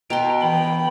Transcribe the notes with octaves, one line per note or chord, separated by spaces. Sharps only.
B2 G5 A#5 C6
E3 G5 B5